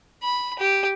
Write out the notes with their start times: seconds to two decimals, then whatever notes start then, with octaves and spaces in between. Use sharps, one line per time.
0.23 B5
0.59 G4